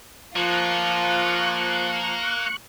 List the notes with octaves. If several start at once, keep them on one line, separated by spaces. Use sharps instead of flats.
F3 A#3 F4 C#6 F#6